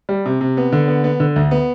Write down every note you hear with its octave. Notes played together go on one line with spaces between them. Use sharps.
G3
C3
C3
B3
D3
B3
B3
D3
D2
B3